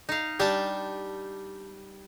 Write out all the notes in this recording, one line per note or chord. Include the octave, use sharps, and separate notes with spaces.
D#4 F5
G3 D4 G4 A5